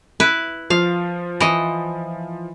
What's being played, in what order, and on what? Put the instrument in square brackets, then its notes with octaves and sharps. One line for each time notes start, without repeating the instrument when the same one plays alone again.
[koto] E4 B4
[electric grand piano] F3 F4 [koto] F5
[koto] E3 D#5